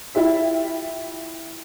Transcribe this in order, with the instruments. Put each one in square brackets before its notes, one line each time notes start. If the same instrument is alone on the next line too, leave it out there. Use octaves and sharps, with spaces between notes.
[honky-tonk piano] E4 F4 G4 E5